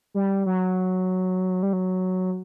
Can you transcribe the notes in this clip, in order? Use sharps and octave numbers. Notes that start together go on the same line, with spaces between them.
G3
F#3
G3
F#3